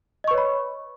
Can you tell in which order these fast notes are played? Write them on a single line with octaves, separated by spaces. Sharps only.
D#5 C#6 B4 C#5 B5